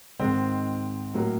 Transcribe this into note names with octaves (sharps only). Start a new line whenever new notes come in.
G#2 D#3 G#3 C4
A2 F#3 A#3